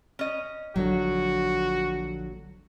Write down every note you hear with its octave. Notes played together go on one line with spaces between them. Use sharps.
C#4 D#5
A#1 D3 F#3 F#4